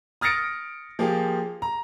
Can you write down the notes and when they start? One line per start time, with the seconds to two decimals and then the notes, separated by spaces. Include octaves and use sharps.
0.21 D#6 F6 A6 A#6 C#7 D7
0.99 F3 A#3 F4 G4 G#4
1.62 A#5